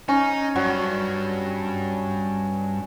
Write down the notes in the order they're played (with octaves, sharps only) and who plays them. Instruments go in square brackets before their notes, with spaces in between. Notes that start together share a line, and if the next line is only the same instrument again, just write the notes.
[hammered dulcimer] C#4 [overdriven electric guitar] D#4
[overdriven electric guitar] G2 [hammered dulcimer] F#3